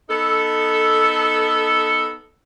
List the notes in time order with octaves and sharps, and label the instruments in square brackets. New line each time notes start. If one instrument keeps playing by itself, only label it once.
[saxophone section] B3 D#4 A4